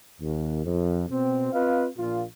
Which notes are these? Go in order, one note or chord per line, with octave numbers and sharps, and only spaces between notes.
D#2
F2
B2 C4
C4 F4 B4 D#5 F5
A#1 A#2 F4